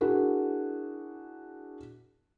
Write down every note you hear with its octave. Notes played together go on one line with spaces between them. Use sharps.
D4 E4 F#4 G#4 A#4